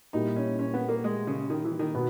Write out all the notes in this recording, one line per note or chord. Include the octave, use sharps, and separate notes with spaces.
A#2 G3 A#3 D#4 E4 G4
C#4
C#4
B3
A#3
G#3
C#3
D#3
E3
D#3
B2 B3